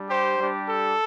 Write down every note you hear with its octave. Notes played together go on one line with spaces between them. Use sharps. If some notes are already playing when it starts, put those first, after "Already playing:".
Already playing: G3 D4
G4 C5
G3 D4 G4
A4